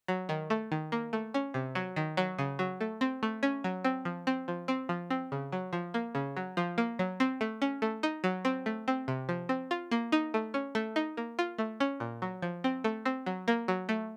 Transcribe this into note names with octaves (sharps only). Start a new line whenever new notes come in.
F#3
D#3
A3
D#3
A#3
A3
C#4
C3
F#3
D#3
F#3
C#3
F#3
A3
C4
A3
C#4
F#3
C4
F3
C4
F3
C4
F3
C4
C#3
F#3
F3
A#3
C#3
F#3
F3
A#3
F#3
C4
A3
C#4
A3
D#4
F#3
C4
A3
C4
C3
F3
C4
F4
A#3
D#4
A3
C#4
A3
D#4
A#3
F4
A3
C#4
A#2
F#3
F3
C4
A3
C4
F#3
A#3
F#3
A3